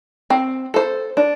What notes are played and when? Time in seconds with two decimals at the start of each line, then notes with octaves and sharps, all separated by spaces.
0.30 C4
0.74 A4 C5
1.17 D4